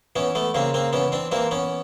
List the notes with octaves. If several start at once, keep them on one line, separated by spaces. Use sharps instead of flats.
E3 B3 C#4
A3 B3
C#3 A#3 C4
A#3 C4
E3 B3 C#4
C4 D4
E3 A#3 C4
B3 C#4